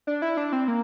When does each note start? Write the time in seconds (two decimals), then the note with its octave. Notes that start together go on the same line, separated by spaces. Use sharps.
0.07 D4
0.22 E4
0.37 D4
0.53 C4
0.68 A#3